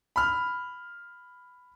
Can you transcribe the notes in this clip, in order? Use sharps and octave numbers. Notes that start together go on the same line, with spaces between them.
B5 F6